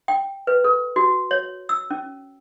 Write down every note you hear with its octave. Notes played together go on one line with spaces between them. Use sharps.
G5
B4
A4
F#4
C#5
E6
C#4